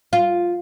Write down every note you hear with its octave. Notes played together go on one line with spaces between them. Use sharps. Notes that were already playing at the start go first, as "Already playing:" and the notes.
F4